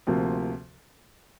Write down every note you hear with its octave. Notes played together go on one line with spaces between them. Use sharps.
D2 C3 F3 A#3